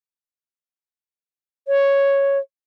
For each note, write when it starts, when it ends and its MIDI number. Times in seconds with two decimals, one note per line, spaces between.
1.68 2.38 73